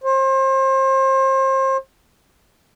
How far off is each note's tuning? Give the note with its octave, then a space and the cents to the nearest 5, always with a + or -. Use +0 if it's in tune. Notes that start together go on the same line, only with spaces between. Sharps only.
C5 +35